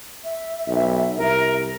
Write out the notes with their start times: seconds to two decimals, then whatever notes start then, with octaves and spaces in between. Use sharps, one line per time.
0.24 E5
0.68 B1
1.18 C2 A#4